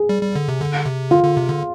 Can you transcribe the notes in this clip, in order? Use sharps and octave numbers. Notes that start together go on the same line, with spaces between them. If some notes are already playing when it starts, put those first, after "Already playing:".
Already playing: G#4
G3
G3
D3
C3
D3
C3
D3 F4
D3
C3
D3